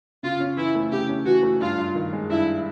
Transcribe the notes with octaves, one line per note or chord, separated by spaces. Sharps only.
C#3 F4
C#4
E3 E4
A3
C#3 G4
C#4
E3 F#4
A3
G2 F4
G2
D#3
G#3
G2 E4